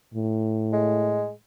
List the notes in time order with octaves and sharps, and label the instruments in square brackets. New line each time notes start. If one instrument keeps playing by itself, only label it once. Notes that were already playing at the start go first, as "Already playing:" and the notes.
[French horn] A2
[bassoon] G#3